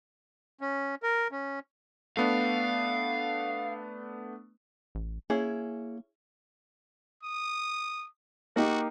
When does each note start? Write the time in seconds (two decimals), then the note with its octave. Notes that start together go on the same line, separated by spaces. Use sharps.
0.61 C#4
1.03 A#4
1.31 C#4
2.17 A3 B3 D4 F5
4.95 A1
5.30 A#3 C#4 E4 G#4
7.23 D#6
8.56 A#3 D#4 F#4 G4